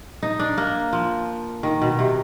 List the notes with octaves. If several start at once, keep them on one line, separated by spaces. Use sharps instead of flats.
D#4
D4
A#3
F3
D#3
B2
C3